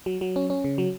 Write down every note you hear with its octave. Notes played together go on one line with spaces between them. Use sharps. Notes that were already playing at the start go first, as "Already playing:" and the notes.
F#3
F#3
C#4
C#4
C#3
F#3